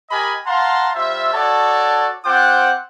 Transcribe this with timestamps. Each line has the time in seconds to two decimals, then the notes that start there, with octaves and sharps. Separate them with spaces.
0.10 G4 A#4 D#5 G#5 B5
0.47 F5 F#5 A5 A#5 C6
0.95 G3 F4 C5 E5
1.33 F#4 A4 C#5 D5 A5
2.25 C4 F4 C5 F#5 G5 D6